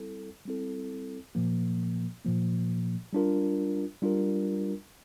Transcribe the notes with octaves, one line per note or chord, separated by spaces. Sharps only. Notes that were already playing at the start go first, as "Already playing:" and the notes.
Already playing: G3 C4 E4 A4
G3 C4 E4 A4
A#2 F3 A#3
A#2 F3 A#3
G3 D4 F4 A#4
G3 D4 F4 A#4